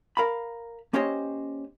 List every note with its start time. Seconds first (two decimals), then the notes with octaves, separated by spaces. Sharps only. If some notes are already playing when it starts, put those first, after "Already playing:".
0.17 A#4 F5 B5
0.93 A#3 C#4 G4 C5 C#5 D#5